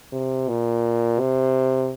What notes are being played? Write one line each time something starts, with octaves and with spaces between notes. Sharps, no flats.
C3
A#2
C3